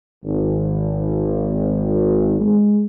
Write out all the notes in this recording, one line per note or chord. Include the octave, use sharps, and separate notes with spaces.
G#1
G#3